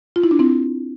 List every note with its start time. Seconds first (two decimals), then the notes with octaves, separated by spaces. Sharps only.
0.16 F4
0.24 E4
0.31 D4
0.39 C4 E4